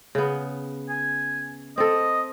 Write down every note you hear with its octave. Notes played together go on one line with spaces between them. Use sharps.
C#3 B3
G#5
C4 A4 D#5